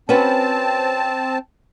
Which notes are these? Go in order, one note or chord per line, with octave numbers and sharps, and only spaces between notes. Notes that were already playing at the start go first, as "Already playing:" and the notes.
C4 C#4 F#4 B4 A5